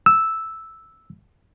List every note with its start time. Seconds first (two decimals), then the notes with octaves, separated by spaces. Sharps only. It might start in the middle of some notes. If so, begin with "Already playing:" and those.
0.06 E6